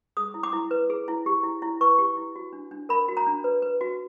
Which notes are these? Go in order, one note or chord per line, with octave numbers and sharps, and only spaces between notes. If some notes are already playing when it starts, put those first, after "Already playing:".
G#4 D#6
E4
D6
E4
B4
G#4
E4
G4
E4
E4
B4 C#6
G4
E4
F#4
D4
D4
A#4 B5
F#4
A#5
D4
B4
B4
F#4